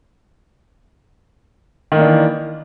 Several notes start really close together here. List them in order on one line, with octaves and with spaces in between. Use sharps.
D#3 A#3 D4 E3